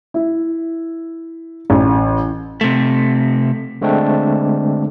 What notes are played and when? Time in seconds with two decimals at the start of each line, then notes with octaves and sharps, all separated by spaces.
0.14 E4
1.70 A1
2.61 C3 A3
3.82 D3 G#3 A3 C4 D4